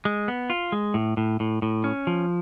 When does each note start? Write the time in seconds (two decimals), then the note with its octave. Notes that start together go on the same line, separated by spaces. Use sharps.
0.05 G#3
0.28 B3
0.50 F4
0.72 G#3
0.94 A2
1.17 A2
1.40 A2
1.62 A2
1.84 C#4
2.07 F3